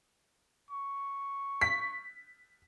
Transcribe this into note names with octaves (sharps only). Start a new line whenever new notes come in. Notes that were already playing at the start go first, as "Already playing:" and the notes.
C#6
B6